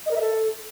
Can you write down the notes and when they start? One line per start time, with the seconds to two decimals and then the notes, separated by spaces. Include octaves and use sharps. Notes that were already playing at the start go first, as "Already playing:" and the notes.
0.06 D#5
0.11 A#4
0.16 E5
0.21 A4